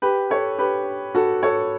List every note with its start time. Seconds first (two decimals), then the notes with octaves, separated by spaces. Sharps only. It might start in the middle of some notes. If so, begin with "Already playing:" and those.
0.02 G4 B4
0.30 A4 C#5
0.59 G4 B4
1.15 F#4 A4
1.43 A4 C#5